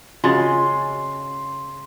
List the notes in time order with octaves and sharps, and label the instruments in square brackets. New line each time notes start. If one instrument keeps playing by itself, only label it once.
[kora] C#3 G#3 [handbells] F4 F#4 A6 [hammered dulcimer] C6